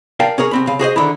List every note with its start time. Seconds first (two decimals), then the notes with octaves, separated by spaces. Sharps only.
0.20 A#4 D5 F5 G5 A5
0.38 C#4 G#4 A#4 C#5
0.51 C2 C4 B5
0.67 C#3 F5
0.79 F#4 G#4 C5 D#5
0.96 D3 D#3 E4